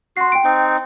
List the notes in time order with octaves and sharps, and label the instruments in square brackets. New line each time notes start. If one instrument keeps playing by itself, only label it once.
[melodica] F#4 [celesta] C6 C7
[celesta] G5 D7
[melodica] C4 D#4